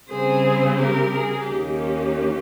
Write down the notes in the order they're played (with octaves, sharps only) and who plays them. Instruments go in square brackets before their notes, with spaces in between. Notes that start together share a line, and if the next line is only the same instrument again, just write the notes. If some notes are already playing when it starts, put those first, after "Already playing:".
[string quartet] C#3 G3 C4 G#4 C5
G4 A#4
G#4
D#2 D#3 A#3 C#4 G4